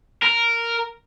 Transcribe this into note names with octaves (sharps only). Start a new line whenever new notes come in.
A#4